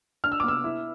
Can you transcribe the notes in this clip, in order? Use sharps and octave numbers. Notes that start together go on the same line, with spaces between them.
D4 F6
E6
D6
B3 E6
E4